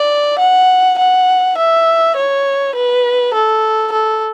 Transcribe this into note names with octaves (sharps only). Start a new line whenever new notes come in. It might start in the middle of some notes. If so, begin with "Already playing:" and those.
Already playing: D5
F#5
F#5
E5
C#5
B4
A4
A4